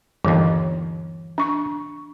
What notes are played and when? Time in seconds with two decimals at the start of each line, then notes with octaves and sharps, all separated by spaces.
0.25 G1 D#2 E3
1.38 D4 C#6